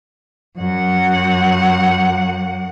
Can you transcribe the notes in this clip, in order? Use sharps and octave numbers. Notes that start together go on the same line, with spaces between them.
F#2 F#5